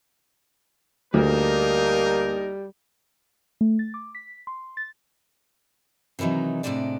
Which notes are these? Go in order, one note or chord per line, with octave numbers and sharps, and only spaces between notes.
D2 G3 A#3 D4 D#4 A#4
A3
A6
D6
B6
C6
A6
C3 D#3 E3 F#3 D#4
A2 C3 G3 G#3 D4 D5